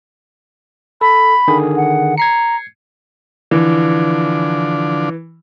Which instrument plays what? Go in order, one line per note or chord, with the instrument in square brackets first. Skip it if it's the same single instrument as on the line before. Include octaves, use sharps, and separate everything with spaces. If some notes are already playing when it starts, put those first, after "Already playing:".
[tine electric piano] A4 [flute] B5
[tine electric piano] D3 D#3 G#4
[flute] F#5
[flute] A#5 [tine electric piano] G#6 C7 C#7
[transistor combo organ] D3 F3 D4 [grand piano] E3